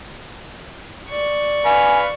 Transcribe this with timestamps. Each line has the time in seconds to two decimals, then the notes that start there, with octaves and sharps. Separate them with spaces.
1.10 D5 C#6
1.66 B4 F5 G#5